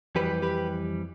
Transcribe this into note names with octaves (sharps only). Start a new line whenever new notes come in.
F2 E3 G3 G4 B4
G4 B4